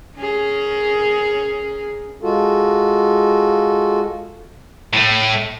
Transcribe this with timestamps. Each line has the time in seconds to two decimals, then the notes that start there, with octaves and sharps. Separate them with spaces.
0.17 C#4 G#4 A#4
2.23 G#3 F4 F#4 A4
4.93 A2 A3